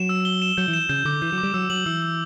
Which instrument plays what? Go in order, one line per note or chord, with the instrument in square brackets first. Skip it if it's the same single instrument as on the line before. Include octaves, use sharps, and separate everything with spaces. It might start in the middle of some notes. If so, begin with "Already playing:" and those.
Already playing: [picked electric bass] F#3 [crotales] E7
[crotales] E6
G7
E7
[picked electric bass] F#3 [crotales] G6
[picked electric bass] E3
[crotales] E7
[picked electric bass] C#3 [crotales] G6
[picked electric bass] D3 [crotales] D6
[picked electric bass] E3 [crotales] G6
[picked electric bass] F#3
[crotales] D6
[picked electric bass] G3
[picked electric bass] F#3 [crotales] E6
[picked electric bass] F#3 [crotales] F#7
[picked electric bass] E3 [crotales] E6
[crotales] E6